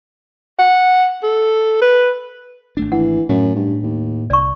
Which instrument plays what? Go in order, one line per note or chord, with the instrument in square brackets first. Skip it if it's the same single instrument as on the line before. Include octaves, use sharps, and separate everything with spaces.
[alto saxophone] F#5
A4
B4
[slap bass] G#1 A3 D4
[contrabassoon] E3 [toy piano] F#5
[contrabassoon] F#2 [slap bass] A2 A3
[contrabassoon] G2
D#2
[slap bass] C2 [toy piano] D5 C#6